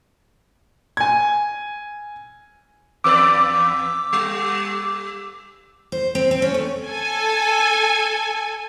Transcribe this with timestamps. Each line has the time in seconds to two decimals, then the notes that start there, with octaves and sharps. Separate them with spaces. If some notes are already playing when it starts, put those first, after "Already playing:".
0.97 G#5 G#6
3.04 E2 B4 D5 D6 E6
4.13 G3
5.92 C5
6.15 C4
6.31 C4
6.42 C#4
6.54 A3
6.87 A4 G#5